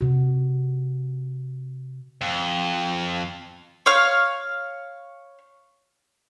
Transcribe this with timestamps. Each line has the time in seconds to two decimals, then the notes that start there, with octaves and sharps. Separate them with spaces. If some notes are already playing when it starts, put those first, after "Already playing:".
0.01 C3 F#4
2.21 F2
3.86 C#5 F5 F6